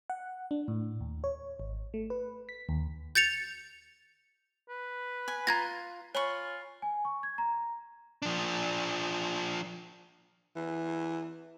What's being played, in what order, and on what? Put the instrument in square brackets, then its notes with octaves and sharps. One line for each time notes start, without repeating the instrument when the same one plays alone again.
[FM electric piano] F#5
D4
A2
D#2
C#5
G#1
A3
B4
B6
D#2
[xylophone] G6 A6 C#7 F7
[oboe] B4
[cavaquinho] G#5
[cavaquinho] F4 [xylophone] A#5 G#6 A#6
[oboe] F4 [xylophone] C#5 [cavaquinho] G#5 B5 C#6
[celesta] G#5
C#6
G#6
A#5
[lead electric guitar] F3 D4
[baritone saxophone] E3